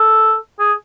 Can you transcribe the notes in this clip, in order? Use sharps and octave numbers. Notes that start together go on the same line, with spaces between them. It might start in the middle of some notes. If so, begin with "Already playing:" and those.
Already playing: A4
G#4